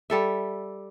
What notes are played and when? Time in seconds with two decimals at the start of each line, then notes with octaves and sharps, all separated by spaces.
0.10 G3 A4 E5